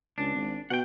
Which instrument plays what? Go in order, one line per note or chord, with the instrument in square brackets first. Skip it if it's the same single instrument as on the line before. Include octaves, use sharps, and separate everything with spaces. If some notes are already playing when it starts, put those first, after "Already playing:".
[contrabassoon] C#2 [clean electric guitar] D4
[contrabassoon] G#1
[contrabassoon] B2 [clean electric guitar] F#5 G5